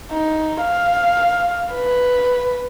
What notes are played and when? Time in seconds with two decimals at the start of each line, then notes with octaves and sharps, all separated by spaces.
0.12 D#4
0.60 F5
1.72 B4